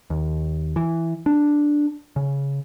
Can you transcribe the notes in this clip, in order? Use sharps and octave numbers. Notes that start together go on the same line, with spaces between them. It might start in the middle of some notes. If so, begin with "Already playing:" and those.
D#2
E3
D4
C#3